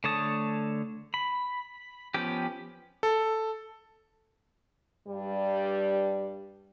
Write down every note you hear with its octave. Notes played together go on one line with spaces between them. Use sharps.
D3 A3 C#5 A5 D#6
B5
F3 B3 C#4 G4
A4
G2 G3